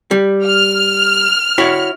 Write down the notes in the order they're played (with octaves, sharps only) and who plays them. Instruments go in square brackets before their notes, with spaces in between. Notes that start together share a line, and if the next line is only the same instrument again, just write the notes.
[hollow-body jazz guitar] G3
[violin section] F6
[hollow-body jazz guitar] E4 F#4 C#5